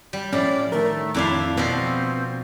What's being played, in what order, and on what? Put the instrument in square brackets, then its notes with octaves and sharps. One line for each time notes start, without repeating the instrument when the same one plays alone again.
[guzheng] G3
[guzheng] A2 [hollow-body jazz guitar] F3 C#4 [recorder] D5
[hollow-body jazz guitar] D#3 A#4 [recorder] A3
[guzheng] F2 D4 F5 [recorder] E4
[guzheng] B2 F3 [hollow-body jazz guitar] B3 [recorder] C4